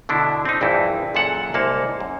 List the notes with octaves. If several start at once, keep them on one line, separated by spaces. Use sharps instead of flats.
B2 D3 D4 E4
C4 D#4
A#1 G2 E3 E4
F#2 A#2 G#4 A4 F#5
C2 G#2 A#3 C#5 A5
F#2